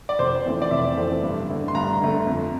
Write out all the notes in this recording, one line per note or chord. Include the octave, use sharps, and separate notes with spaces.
D5
F1 C5
F2 E3 A3 C4
D5
F1 E5
F2 E3 A3 C4
G2
D3 A3
C6
G2 A#5
D3 A3
F2